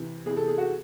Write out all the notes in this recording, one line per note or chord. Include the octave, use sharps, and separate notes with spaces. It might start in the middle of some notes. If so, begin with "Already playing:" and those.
Already playing: C3 E3
C3 E3 G#4
A4
G#4
F#4